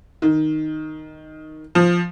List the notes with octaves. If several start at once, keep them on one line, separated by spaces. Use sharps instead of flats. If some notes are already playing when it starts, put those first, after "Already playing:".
D#3
F3